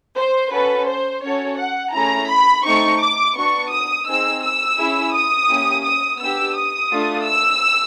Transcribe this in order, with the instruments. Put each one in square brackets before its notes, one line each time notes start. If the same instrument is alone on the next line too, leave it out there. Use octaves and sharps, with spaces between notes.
[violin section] C5
C#4 F#4 A4 B4
C5
C#4 F#4 A4 C#5
F#5
A3 C#4 E4 G#4 A#5
B5
A3 C4 D#4 C#6
D6
B3 D4 F#4 C#6
D#6
C4 D#4 G#4 E6
E6
C#4 E4 G#4
D#6
A#3 C#4 E4 G4
D#6
B3 D4 G4 E6
D#6
A3 D4 F4
E6